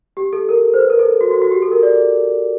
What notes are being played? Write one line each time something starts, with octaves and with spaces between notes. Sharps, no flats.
G4
A4
A#4
C5
B4
A#4
A4
F#4
F#4
F#4
G4
A4
A#4
D5